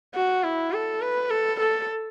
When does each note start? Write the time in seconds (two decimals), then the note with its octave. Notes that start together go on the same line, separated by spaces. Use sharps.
0.15 F#4
0.43 E4
0.73 A4
1.02 B4
1.30 A4
1.60 A4